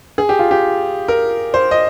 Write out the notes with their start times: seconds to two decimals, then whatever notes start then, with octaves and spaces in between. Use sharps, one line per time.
0.18 G#4
0.29 G4
0.39 F4
0.51 G4
1.08 A#4
1.54 C5
1.71 D#5